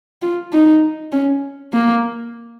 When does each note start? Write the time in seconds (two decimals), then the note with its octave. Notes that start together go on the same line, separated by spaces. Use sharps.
0.22 F4
0.53 D#4
1.12 C#4
1.73 A#3